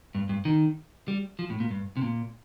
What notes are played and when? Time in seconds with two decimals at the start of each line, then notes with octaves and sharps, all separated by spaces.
0.15 G2
0.29 G2
0.45 D#3
1.08 G3
1.39 F3
1.50 A2
1.60 A#2
1.71 G2
1.97 C3
2.02 A#2